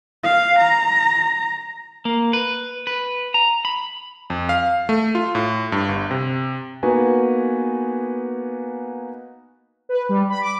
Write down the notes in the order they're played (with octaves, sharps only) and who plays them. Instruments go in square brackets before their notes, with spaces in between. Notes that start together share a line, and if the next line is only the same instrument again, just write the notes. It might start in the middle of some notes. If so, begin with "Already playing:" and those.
[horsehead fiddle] F5
A#5
[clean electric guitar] A#3
B4
B4
A#5
B5
[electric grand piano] F2
F5
A3
F4
A2
G2
G1
C3
A#3 B3 D#4 F#4 B4 G#5
[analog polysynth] B4
G3
B5
D6